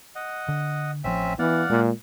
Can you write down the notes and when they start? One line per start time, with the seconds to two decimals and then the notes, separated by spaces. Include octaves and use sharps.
0.15 D#5 F#5
0.48 D3
1.04 A1 F3 C4 C#4 E5
1.39 E3 B3 D5 F5 F#5
1.70 A#2 G#3